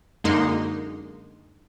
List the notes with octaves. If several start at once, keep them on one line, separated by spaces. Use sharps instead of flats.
F#2 D3 G#3 A#3 D#4 C6